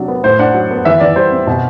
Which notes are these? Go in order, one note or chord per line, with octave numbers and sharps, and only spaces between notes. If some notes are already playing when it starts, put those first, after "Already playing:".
Already playing: C3 F#3 D4
B3
A2 C5
D4 F#5
F#3
B3
E3 E5
E3 D5
G3 C5
C4
B2